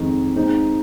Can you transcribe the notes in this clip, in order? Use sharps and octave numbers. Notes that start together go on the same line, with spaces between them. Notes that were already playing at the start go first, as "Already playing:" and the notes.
Already playing: F2 D#3 G#3 D#4
G#3 C4 D#4